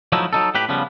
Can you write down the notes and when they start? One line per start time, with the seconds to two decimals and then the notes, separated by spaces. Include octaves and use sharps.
0.12 F3 F#3 A3 D#4 E4
0.33 F#3 D#4 A4
0.55 A2 G4 B4 G5 B5
0.69 C#3 F3 G3 B3